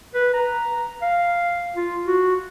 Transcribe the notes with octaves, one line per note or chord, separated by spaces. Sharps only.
B4
A#5
F5
F4
F#4